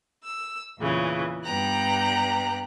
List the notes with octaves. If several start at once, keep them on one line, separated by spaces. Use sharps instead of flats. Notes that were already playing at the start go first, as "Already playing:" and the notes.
E6
E2 A#2 C#3 E3
G2 G3 B3 G5 A#5 F#6